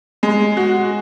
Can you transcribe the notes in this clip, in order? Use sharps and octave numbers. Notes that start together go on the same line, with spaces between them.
G#3
F#4